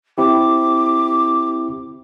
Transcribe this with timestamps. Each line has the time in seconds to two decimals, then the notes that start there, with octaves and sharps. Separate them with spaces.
0.18 C4 E4 G4 D6